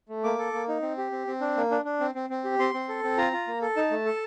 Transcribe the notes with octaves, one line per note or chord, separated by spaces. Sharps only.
A3
A#3 D6
A4
A#3
D#4
C4
G4
C4
C4
D4
A#3
D4
D4
C4
C4
C4
G4
C4 C6
C4
A4
C4
F4 A#5
F4
A#3
A4
D#4 A5
A3
A4